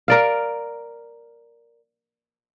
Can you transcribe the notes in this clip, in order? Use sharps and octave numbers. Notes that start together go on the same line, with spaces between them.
A#4 D5 F5